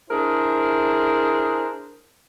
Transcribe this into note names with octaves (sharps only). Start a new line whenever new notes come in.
D4 E4 G#4 A#4 C5